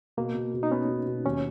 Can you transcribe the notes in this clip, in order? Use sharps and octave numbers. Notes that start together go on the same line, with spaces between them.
B2 A#3
B2
B2
D#4
B3 C#4
B2
B2
D#2 C#4